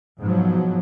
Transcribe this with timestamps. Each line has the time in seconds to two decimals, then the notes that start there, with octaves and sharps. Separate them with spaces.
0.20 G#2 B2 F3 F#3